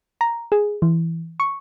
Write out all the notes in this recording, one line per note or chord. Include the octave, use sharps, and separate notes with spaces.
A#5
G#4
E3
C#6